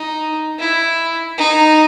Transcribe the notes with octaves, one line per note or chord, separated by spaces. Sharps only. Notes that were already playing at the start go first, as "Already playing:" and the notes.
Already playing: D#4
E4
D#4